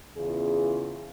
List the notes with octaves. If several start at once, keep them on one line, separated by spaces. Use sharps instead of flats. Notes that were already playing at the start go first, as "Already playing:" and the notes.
E2 C#3 F4 G#4